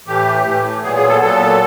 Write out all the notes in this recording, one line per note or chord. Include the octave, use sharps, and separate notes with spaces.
A2 E3 A3 G4
A2 E3 A3
A#2 F#3 B3 G#4
G#4
A4
A#2 F#3 B3 A4